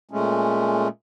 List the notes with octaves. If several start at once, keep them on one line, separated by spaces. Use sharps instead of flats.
A#2 G#3 A3 C#4